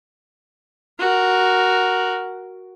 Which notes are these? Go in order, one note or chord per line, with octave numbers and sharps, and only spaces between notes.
F#4 A#4